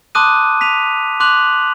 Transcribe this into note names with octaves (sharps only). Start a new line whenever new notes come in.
A5 C6 D6 D#6 F#6 D#7
B6 D#7 F7
C6 D6 F#6 F7 F#7